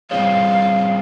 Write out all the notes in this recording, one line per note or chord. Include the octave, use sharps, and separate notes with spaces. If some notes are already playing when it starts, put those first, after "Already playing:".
G3 C4 F4 G#4 C#5 F5